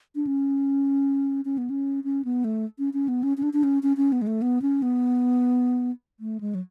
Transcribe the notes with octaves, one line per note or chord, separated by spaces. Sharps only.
D4
C#4
C#4
B3
C#4
C#4
B3
A3
C#4
C#4
B3
C#4
C#4
D4
D4
C#4
C#4
C#4
B3
G#3
A3
B3
C#4
B3
A3
G#3
F#3